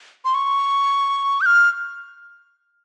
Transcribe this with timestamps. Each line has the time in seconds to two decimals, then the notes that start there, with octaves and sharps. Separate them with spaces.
0.25 C6
0.34 C#6
1.41 G6
1.46 F6